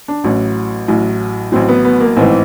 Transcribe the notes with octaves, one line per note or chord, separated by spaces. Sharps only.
D4
A1 A2 F#3 C#4
A1 A2 F#3
A1 A2 F#3 C4
B3
B3
A#3
A1 G#2 E3 C4